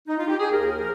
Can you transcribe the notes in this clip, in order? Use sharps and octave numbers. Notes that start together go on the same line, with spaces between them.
D#4
F4
G4
G#4
D#2 A#4
F3